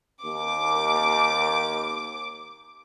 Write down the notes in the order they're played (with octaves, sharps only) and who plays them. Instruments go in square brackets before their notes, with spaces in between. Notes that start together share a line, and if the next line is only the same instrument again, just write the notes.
[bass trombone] D#2 [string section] D6